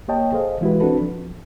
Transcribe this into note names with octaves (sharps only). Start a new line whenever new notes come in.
A#3 G4 C#5 D#5 G5 A5
G#4 A4 C5 D#5 F5
E3 G#3 E4 F#4 G4 B4
C4 D4 F#4 A4 B4
F3